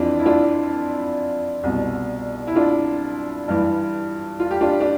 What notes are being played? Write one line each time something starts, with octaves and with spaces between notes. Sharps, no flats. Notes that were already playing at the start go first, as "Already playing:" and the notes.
Already playing: F2 E3 D4 F4
E4
D4 F4
C2 B2
E4
D4 F4
G2 E3
F4
G4
D4 F4
D4